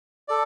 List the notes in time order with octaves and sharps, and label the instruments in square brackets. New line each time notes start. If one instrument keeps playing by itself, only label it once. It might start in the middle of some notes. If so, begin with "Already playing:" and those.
[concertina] A4 D5